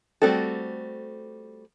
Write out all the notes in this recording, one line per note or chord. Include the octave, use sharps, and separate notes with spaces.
G3 A3 C4 F#4 A4